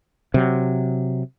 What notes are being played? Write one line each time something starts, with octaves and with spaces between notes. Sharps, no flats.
C3 F#3